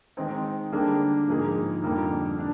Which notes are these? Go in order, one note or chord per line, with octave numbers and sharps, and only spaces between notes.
D#3 G#3 C4 D#4
D3 G3 A#3 D4 G#4
G#2 F3 A#3 D#4 G#4
F2 D3 G3 A#3 D#4
D4